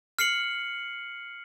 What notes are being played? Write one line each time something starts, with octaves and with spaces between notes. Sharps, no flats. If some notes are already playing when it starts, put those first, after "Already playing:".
F6 C7 C#7 F#7